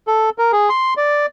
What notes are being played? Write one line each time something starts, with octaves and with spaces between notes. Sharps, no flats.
A4
A#4
G#4
C6
D5